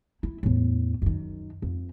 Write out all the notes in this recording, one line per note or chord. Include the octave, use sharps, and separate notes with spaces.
E4
E2 A2
F#2 D#3
F2